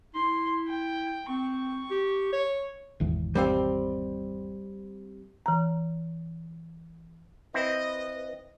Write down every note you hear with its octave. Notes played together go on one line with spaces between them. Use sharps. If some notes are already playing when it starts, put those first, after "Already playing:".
E4 C6
G5
C4 C#6
G4
C#5
G#1 E2 B2
G3 C4 F5
E3 A#5
C4 E4 B4 D#5